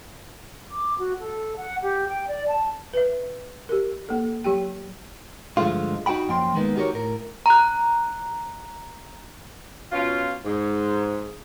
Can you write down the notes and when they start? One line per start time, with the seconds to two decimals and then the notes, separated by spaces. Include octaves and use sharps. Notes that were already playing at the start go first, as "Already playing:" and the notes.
0.70 D6
0.98 F#4
1.20 A4
1.57 F#5
1.83 G4
2.09 G5
2.28 D5
2.48 A5
2.94 B4 E5
3.69 G4 A#4
4.09 A#3 A4
4.44 F#3 G4 G5
5.57 G2 D3 F3 G#3 A3 F4
6.06 D#4 F#4 F#5 G5 B5
6.28 F#2 F3 A#3 G5 C6
6.54 D#3 G#3 A#3 B3 D#4
6.76 D#4 F#4 G4 A4 A#4 C#5
6.93 A2 A#4
7.46 A#5 F#6
9.91 B2 C#4 F4
10.44 G#2